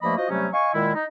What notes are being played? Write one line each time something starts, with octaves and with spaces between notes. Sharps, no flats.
G2 F3 A3 A#3 D#5 B5
F4 F#4 C5 D#5
C3 F#3 G3 A3 C#4
D#5 F5 G#5 C#6
A#2 D#3 G#3 E4
D#4